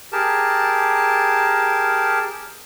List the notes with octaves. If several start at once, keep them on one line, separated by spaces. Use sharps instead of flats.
G4 G#4 A#4 A5